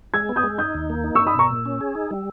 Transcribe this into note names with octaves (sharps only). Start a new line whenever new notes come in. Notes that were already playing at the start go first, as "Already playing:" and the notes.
G#3 E6 G#6
B3
D#6 G6
G#3
D#4 D#6 G6
D#2
A#3
D#4
C#6 E6
D#4
B5 D#6
B2 A#5 C#6
A#2
C#4
G#4
D#4
G3